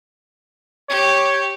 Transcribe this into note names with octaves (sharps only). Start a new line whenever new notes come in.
G4 C#5